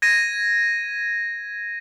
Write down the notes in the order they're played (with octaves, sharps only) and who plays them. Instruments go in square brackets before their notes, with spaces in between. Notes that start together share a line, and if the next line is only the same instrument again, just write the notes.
[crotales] G#6 A#6 D#7